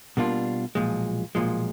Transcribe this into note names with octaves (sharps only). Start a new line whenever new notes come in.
B2 G3 A#3 D4 F4
B1 A#2 F3 G#3
B1 A#2 F3 G#3